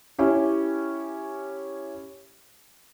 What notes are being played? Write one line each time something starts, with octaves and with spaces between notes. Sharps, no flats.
C#4 E4 G4